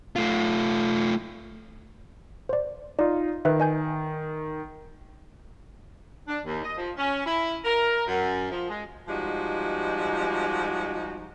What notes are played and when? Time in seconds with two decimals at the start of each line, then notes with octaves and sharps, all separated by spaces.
0.16 A3 F4
2.49 C5 D5
2.99 D#4 F4 D5
3.45 D#3 B4 E5
3.60 D#5 G#5 G6
6.28 D4
6.45 D#2
6.63 D#5
6.78 F3
6.97 C#4
7.26 E4
7.65 A#4
8.07 F#2
8.51 F3
8.70 G#3
9.08 F3 G3 G#3 D#4 F#4